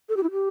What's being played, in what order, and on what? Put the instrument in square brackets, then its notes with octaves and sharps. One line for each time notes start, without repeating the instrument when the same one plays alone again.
[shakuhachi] A4
G4
E4
G4